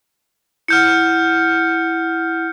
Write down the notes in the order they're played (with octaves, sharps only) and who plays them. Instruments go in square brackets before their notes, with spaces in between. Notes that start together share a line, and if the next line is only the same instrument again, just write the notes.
[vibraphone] E4 F#5 [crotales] F6 G6 C#7